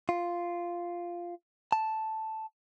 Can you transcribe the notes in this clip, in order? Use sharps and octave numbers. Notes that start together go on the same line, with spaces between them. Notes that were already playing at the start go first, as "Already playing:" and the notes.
F4
A5